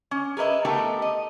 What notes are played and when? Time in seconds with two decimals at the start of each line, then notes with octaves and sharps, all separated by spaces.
0.11 C#4
0.37 G#4 A#4 B4 D#5 E5
0.65 A3 B3 D#4 G4 A4 A#4
1.02 D#5